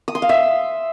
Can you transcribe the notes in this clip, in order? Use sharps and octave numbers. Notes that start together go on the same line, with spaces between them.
D#6
C6
F5
E5